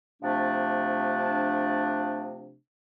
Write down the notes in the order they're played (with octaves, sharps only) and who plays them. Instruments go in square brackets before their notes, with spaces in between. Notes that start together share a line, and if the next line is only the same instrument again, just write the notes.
[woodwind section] C3 F3 A3 D4